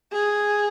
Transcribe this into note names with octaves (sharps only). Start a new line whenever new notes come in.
G#4